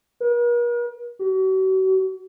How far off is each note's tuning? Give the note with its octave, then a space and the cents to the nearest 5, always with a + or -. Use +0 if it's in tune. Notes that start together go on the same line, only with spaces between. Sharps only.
A#4 +45
F#4 +40